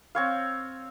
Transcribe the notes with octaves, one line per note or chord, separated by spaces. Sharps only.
C4 C#5 F5